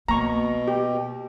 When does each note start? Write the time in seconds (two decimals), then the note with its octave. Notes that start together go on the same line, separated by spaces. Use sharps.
0.08 B2 A#3 A#5 C#6
0.68 G4